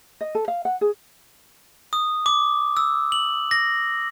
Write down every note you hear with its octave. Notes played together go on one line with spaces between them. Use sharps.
D#5
A4
F5
F#5
G#4
D#6
D6
E6
F#7
A#6